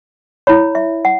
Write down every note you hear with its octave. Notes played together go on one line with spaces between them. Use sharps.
E4 C#5 B5
E5
F#5